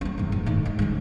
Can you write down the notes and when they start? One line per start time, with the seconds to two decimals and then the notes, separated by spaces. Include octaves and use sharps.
0.01 C4 C#4
0.18 E2 G#2
0.32 G#2
0.46 A2 D#3
0.66 E2 G#2
0.79 G#2 C#3